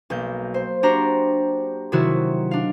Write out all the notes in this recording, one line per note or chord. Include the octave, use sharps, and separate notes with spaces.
B1 A#3 G6
C5
D4 F#4 G4 C5 A#5
C3 D#3 F#3 E4 F#4
D4 F5